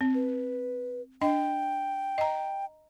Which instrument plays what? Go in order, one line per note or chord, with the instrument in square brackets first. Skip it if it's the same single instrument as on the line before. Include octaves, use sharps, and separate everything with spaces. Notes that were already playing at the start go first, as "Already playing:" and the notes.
[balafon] C4
[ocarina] B4
[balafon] D4 D#5 [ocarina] G5
[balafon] D#5 A#5